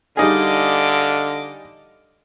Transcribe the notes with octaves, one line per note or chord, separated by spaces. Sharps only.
D3 G3 D#4 G#4 D#5 F5 D6